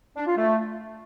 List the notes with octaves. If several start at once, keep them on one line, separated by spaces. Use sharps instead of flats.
D4
F4
A3